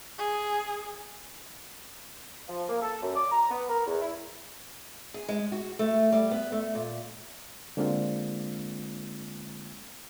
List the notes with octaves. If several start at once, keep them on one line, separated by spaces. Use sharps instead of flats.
G#4
F3
A#3
A4
F#2
D6
A#5
B3
A#4
E2
E4
G#4
G#3
F#4
A3
G3
B3
A3
A#2
D3 G#3 A#3 C4 D4 F4